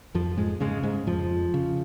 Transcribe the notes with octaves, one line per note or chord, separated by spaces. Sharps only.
F2 F3
G#2 G#3
G#2 C#3 G#3
G#2 G#3
F2 F3
C#3